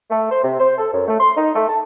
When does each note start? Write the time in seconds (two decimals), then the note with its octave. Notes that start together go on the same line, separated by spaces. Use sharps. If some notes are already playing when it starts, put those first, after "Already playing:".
0.11 A3
0.31 C5
0.44 C3
0.60 C5
0.78 A4
0.94 F#2
1.08 A3
1.20 C6
1.37 D#4
1.55 A3
1.69 A5